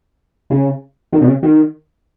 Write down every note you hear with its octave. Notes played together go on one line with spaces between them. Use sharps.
C#3
D#3
B2
C#3
D#3